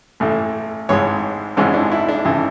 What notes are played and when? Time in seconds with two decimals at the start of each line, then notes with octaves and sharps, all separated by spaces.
0.20 A1 A2 E3 A3
0.89 G#1 G#2 E3 C#5
1.57 G#1 G#2 E3 C#4
1.74 D4
1.92 E4
2.09 D4
2.25 G#1 C#3 E3